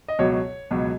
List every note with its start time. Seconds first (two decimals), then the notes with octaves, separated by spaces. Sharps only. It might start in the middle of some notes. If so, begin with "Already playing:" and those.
0.08 D#5
0.19 C#2 B2 F#3 C#5
0.71 C#2 B2 F#3